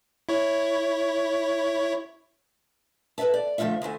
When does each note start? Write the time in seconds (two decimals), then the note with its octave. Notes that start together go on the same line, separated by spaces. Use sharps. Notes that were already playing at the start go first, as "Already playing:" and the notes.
0.29 E4 C#5
3.18 A4 B4 D5 E5 A5
3.34 D5
3.58 D3 F3 A3 D#4 F4 E5
3.82 D2 D3 A3 G#5